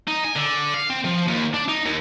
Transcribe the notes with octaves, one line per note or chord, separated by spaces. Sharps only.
D#4
G#5
D3
F5
C4
F3
D#2
D4
D#4
D#2